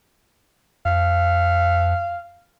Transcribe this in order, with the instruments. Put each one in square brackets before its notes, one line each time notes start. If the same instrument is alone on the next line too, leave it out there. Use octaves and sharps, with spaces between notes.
[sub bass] F2 [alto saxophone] F5